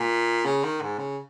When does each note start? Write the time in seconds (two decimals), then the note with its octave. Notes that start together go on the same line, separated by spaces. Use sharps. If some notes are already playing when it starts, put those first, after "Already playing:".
Already playing: A#2
0.45 C#3
0.64 D#3
0.82 G#2
0.98 C#3